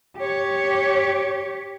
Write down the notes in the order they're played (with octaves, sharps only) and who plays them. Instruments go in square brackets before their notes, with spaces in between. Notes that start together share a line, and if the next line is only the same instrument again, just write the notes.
[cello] G4 C#5